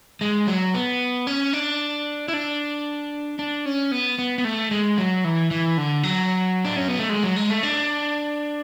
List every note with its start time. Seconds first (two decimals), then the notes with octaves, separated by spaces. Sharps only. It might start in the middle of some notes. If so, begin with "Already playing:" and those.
0.21 G#3
0.47 F#3
0.74 B3
1.27 C#4
1.53 D4
2.28 E4
2.33 D4
3.39 D4
3.66 C#4
3.92 B3
4.19 B3
4.38 B3
4.44 A3
4.71 G#3
4.98 F#3
5.24 E3
5.51 E3
5.77 D3
6.03 F#3
6.65 D4
6.76 C#4
6.88 B3
6.99 A3
7.10 G#3
7.23 F#3
7.36 G#3
7.50 A3
7.63 D4